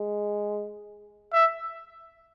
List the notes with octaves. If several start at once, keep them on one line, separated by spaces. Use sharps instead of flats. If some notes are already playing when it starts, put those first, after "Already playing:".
Already playing: G#3
E5